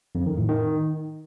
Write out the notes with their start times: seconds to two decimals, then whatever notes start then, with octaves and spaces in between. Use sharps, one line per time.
0.15 F2
0.26 D#3
0.38 A2
0.49 D#3